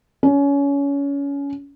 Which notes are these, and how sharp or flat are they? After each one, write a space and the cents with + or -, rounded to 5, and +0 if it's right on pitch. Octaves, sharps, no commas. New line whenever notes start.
C#4 +25